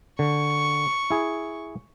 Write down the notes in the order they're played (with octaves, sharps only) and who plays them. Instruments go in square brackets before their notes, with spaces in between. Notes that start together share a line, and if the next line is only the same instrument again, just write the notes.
[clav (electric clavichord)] D3 [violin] C#6
[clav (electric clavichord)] E4 G#4